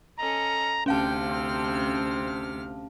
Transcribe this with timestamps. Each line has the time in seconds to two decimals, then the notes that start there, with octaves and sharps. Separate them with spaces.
0.19 C#4 A4 D#5 A#5
0.86 D2 C3 C#4 F5 G5 A5 F6
1.29 C4